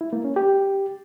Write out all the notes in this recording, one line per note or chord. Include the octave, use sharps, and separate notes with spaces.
E4
A#3
C#4
G4